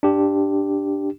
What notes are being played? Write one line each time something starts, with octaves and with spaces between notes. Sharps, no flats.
D4 G4